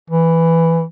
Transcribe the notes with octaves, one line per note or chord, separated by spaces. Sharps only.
E3